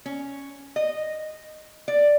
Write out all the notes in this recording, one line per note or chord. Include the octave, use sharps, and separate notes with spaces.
C#4
D#5
D5